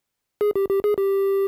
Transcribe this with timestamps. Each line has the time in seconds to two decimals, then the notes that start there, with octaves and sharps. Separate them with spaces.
0.41 G#4
0.56 G4
0.70 G4
0.84 G#4
0.98 G4